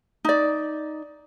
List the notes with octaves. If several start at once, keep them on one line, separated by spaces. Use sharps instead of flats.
D#4 D5